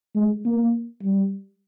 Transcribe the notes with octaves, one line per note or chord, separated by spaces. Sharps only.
G#3
A#3
G3